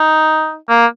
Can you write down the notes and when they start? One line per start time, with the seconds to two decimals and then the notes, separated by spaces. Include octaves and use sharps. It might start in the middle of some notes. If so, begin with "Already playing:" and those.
Already playing: D#4
0.70 A#3